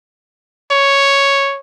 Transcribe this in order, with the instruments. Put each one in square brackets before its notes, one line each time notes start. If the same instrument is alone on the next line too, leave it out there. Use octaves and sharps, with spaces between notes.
[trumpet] C#5